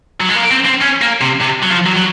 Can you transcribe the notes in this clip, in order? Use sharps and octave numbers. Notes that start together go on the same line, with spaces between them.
F#3
G#3
A#3
C4
C4
C#4
A#3
C3
C3
F#3
F3
F#3
F#3